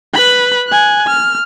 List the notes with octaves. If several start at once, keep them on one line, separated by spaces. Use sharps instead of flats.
B4 B5
G#5 F#6
F6